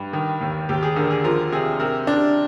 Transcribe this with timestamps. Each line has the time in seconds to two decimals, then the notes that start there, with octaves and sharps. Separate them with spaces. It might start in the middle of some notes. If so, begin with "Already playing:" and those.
Already playing: G2
0.13 D#3
0.41 D#2
0.69 D#2 G4
0.83 G#4
0.96 D3 A#4
1.11 G#4
1.24 F3 A#4
1.52 C3 G#4
1.80 C3 A#4
2.07 C3 D4